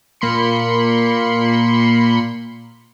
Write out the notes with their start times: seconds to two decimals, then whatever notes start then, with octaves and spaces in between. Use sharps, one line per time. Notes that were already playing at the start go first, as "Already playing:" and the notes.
0.21 A#2 A#3 B5 C6 C#7